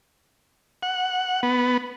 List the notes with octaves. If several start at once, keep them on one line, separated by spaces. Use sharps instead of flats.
F#5
B3